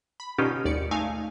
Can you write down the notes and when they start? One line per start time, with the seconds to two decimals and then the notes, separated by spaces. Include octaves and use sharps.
0.20 B5
0.38 B2 D3 C#4 D#4 F4 G4
0.64 G#1 D#2 D5 C#7
0.91 A3 D#4 F5 G#5